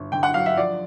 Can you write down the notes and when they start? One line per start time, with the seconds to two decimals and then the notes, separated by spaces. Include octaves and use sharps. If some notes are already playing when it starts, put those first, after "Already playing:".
Already playing: G1
0.12 D3 G5
0.23 F#5
0.34 F#3 F5
0.46 E5
0.57 F3 D5